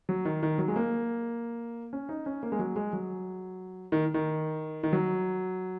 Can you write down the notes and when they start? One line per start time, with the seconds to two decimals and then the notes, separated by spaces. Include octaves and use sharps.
0.09 F#3
0.25 D#3
0.43 D#3
0.58 F#3
0.68 G#3
0.76 A#3
1.93 C#4
2.09 D#4
2.26 C#4
2.43 A#3
2.52 G#3
2.59 F#3
2.76 G#3
2.93 F#3
3.92 D#3
4.14 D#3
4.83 D#3
4.93 F#3